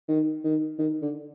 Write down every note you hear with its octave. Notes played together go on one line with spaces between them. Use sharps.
D#3
D#3
D#3
D3